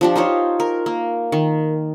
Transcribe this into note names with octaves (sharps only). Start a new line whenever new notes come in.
F3 D4 G4
D#4 F4 C5 C#5
A#4
A#3
D#3